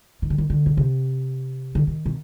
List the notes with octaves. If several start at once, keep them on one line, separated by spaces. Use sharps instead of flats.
D#3
D3
D#3
D3
B2
C3
D3
D#3
B2